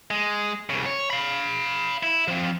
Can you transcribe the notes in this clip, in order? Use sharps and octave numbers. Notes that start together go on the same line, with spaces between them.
G#3
C2 C#3
C#5
F5 B5
E4
F3 C4